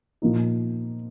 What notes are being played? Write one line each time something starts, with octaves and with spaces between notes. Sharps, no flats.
A#2 F3 A#3 D#4